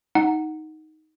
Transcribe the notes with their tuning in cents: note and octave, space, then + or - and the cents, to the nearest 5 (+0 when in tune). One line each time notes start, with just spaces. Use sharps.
D#4 +10 F#5 +0